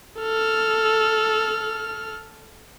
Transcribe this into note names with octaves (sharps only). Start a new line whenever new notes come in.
A4 F6